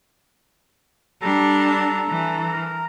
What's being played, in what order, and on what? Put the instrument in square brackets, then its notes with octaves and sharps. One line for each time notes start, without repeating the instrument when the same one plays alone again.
[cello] G3 D4 [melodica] A4 A#5
[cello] E3
[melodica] A#4 A#5